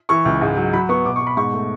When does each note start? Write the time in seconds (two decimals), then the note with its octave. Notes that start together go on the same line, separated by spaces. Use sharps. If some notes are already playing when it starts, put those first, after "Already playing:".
0.09 E3 C#6
0.25 C#2
0.41 G#2
0.57 F#3
0.73 F#3 B5
0.89 B3 C#6
1.06 B2 D6
1.16 C#6
1.21 B2
1.27 B5
1.37 G#2 C#6
1.53 A3